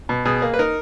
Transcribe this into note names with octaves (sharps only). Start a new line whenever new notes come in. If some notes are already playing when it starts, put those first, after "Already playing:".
B2
B2 G#4
A#3
B4
D#4 A#4